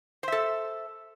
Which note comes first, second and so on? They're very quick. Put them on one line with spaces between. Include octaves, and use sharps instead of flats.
C5 E5 A4